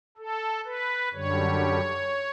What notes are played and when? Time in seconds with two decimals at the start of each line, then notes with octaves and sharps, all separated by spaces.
0.18 A4
0.66 B4
1.13 F#2 D3 G3 C#5